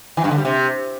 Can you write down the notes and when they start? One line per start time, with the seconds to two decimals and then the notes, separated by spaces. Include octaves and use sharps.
0.17 E3
0.24 G2
0.31 D3
0.38 G3
0.45 C3